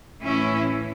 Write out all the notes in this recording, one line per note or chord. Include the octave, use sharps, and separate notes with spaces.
A2 E3 C#4 E4